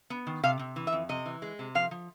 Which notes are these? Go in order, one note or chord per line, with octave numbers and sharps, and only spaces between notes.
B3
D#3
C3 F5
C3
E3
E5
F2
C3 D#5
E3
G#3
C3
F3 F5
F3